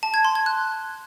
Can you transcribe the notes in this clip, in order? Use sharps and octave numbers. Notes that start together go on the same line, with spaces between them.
A5
G#6
C6
G#6
F#6